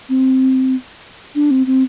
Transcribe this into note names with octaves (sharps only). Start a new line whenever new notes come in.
C4
D4
C4
C4